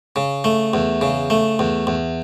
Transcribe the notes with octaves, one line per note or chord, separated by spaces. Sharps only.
C#3
A3
E2
C#3
A3
E2
E2